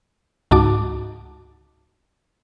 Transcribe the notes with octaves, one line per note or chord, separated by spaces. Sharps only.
C#2 G#2 D#4 F#4 A5 D6